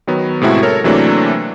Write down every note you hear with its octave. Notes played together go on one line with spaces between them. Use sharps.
D#3 F#3 B3
A2 C3 G#3 E4 F#4
A4 A#4 C#5
C3 E3 F#3 A3 A#3 D4